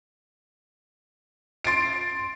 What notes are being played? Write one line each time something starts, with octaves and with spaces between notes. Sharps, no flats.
C6 A6 C7 D7